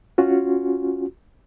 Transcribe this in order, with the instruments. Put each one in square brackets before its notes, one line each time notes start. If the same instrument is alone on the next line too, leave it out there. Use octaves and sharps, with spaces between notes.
[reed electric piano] C#4 F4 F#4